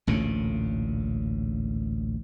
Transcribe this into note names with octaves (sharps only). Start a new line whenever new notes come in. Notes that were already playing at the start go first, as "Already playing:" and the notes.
A1 D2 A#2 C#3